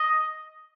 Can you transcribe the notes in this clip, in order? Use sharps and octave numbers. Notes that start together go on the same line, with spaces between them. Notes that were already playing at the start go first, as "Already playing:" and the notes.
Already playing: D#5